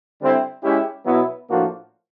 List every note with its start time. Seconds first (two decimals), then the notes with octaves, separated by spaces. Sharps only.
0.20 D3 G3 C4 E4
0.62 G#3 C#4 E4 G4
1.05 B2 F#3 B3 E4
1.49 A2 F3 A#3 D4 F#4